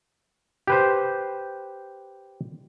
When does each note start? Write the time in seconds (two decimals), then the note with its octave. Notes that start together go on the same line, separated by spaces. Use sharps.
0.67 G4 B4 C5